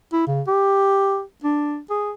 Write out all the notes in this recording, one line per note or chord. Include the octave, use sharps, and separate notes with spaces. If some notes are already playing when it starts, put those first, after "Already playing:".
E4
C#3
G4
D4
G#4